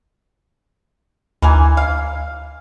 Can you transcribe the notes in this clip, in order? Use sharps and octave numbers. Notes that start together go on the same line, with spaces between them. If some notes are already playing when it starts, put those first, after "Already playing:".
D2 E3 A#3 G#5
F5